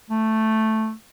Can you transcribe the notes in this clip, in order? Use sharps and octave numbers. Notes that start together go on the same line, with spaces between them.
A3